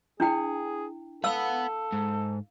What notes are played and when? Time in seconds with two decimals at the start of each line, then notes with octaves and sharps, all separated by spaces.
0.20 D4 E4 G#4 G5
1.24 A4 B4 F5 F#5 E6
1.92 G#2